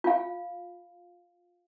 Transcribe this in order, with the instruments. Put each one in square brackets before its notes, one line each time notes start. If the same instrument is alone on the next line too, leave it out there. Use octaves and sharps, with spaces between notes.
[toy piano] F4 F5